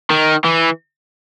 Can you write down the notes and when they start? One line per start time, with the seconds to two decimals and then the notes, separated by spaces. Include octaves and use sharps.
0.10 D#3
0.45 E3